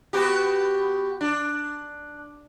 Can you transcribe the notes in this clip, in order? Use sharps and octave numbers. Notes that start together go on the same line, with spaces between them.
B3 F#4 G4
D4